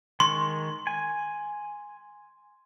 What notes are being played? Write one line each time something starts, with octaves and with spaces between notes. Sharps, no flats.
D#3 G#3 C6 C#6
G#5